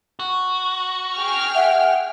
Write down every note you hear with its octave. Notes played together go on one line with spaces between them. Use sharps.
F#4
G#4 G5 F6
E5 F#5